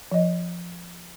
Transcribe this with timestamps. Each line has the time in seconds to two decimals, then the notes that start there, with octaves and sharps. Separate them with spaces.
0.12 F3 D#5